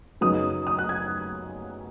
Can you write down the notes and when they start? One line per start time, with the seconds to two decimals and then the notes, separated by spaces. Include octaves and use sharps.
0.21 F#2 C#3 F#3 B3 D#4 D#6
0.67 D#6
0.79 F#6
0.89 G#6